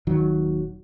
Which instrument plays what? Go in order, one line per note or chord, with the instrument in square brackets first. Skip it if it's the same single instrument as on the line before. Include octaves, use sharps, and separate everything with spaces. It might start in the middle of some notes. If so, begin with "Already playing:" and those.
[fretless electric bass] D#1 D#3 F#3